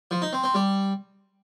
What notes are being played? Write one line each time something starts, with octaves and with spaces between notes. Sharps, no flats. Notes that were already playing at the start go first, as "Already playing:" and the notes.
F3
D#4
C4
C4
G3